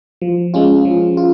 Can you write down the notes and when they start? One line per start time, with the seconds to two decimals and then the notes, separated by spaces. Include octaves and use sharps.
0.21 F3
0.54 G#3 C#4 F4
0.85 F3
1.17 F4